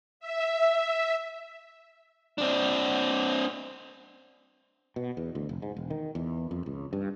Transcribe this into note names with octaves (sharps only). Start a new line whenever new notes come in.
E5
C4 D4
B2
E2
D2
F1
G#2
E1
D#3
E2
F2
C#2
G2